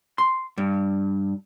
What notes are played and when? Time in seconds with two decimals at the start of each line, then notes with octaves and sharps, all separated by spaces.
0.18 C6
0.58 G2